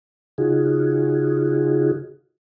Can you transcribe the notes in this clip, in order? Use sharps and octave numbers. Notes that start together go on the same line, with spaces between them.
C#3 D#4 F4 F#4 G#4